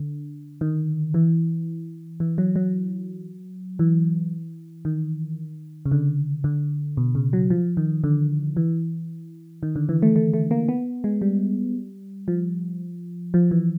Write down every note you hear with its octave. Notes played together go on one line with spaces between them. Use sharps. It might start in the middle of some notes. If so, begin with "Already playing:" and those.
Already playing: D3
D#3
E3
E3
F#3
F#3
E3
D#3
C#3
D3
D3
B2
C#3
F#3
F3
D#3
D3
E3
D#3
D3
E3
A3
A3
A3
A#3
B3
G#3
G3
F3
F3
E3